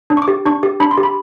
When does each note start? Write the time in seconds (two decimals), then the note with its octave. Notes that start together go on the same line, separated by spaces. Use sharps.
0.10 D4
0.17 C#6
0.22 D6
0.28 G4
0.45 D4 C#6
0.63 G4
0.80 D4 B5
0.91 C6
0.98 G4
1.03 B5